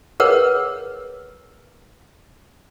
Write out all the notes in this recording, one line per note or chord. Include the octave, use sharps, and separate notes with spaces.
G#4 A#4 B4 C#5 F#5